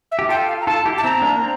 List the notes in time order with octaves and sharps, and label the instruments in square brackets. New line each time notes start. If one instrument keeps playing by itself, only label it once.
[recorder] E5
[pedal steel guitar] G4
[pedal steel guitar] F4 A4 [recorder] G5
[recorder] F5
A#5
[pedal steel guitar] F4 A4 [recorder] A5
[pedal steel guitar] E4 G4
[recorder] A5
[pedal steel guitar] C4 E4 [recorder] A#5
[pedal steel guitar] A#3 D4
C4